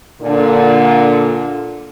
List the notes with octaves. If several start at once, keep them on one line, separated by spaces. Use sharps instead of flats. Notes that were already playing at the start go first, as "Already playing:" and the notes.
A#2 D3